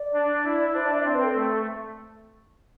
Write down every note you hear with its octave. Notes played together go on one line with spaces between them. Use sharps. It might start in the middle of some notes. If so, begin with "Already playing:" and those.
Already playing: D5
D4
E4 D5
D4 C5
D5
E5
C4 D5
B4
A4
A3